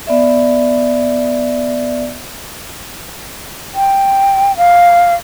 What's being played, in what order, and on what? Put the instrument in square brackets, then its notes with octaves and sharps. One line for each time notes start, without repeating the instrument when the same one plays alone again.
[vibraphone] B3 D5 E5
[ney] G5
F5